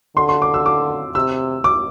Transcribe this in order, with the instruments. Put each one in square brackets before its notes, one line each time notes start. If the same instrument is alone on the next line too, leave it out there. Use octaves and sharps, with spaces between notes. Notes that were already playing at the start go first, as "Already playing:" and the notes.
[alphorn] D3 [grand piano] C6
[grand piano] C6
D6
E6
D6
[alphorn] C3 [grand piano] E6
[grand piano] D6